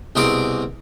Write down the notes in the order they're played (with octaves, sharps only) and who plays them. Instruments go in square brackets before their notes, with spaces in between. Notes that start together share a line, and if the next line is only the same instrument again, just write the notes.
[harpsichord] C2 B2 C4 G#4 A#4 D6